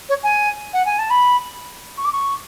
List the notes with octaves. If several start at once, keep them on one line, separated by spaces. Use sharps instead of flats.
C#5
G#5
F#5
G#5
A5
B5
C#6
D6
C#6